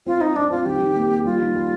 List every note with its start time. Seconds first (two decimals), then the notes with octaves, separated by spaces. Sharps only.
0.06 C4 F4
0.21 C4 D#4
0.36 C4 D4
0.51 C4 F4
0.65 D#3 G4
0.80 D#3
0.96 A#3
1.11 A#3
1.25 G3 F4
1.40 D#3
1.55 G3